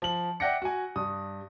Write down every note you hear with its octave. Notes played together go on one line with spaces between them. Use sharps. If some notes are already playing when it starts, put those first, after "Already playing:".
F3 F#7
D5 E5 F#5 G5 A#6 C#7
F#4 G#5
G2 D#6